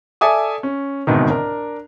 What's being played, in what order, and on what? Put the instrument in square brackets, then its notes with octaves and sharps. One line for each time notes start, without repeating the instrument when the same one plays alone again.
[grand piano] A4 D5 E5 G#5 D6 D#6
C#4
G1 C2 G#2 B2 D#3
D4 A#4